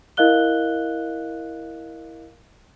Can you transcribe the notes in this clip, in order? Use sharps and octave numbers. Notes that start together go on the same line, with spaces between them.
E4 A#4 D#5 F5 F#6 G7